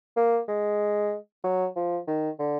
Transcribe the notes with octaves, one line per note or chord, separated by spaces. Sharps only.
A#3
G#3
F#3
F3
D#3
D3